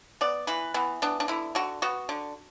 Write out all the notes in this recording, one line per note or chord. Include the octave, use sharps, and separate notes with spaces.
B3 D5
E3 B4
E3 B3
B3 D4
D4
D3 E4
D3 F#4
B3 F#4
D3